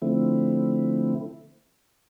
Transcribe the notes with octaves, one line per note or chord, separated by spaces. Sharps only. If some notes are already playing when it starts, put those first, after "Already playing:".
D3 F3 A3 C4 E4